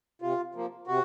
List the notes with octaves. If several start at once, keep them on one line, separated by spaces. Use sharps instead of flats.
C3 F4
F3 A#3
C3 F#4